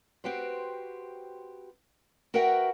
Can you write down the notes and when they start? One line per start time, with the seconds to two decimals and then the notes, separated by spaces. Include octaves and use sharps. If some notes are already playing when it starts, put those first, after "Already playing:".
0.24 C4 F#4 G4 B4 C5
2.34 F#4 A#4 B4 E5 F#5 G5